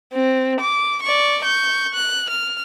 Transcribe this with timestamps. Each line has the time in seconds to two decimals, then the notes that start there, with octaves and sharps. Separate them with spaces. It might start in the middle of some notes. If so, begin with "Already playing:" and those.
0.13 C4
0.61 D6
1.03 D5 C#6
1.43 C#6 G6
1.94 F#6
2.30 F6